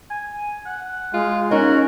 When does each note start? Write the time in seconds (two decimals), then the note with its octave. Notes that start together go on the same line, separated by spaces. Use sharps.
0.11 G#5
0.66 F#5
1.14 G#3 F4
1.51 C#4 D#4 F#4 A#4